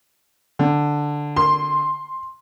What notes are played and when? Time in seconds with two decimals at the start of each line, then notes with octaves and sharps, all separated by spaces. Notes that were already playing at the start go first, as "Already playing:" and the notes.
0.59 D3
1.36 C6